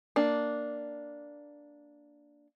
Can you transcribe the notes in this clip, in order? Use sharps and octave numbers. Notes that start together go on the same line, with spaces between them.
A#3 D4